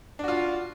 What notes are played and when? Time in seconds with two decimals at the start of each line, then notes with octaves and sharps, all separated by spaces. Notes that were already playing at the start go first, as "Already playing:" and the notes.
0.19 D4
0.24 F#4
0.28 F4